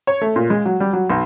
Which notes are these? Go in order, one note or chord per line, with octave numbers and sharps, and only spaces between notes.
C#5
A3
A#2
G#3
F#3
G3
F#3
B1